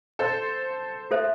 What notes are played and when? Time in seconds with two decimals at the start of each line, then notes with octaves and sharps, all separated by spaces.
0.19 A4 C5
1.11 F4 A4 C5 E5